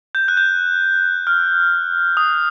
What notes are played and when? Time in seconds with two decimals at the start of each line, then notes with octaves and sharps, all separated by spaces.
0.15 G6
0.28 F#6
0.37 G6
1.27 F6
2.17 D#6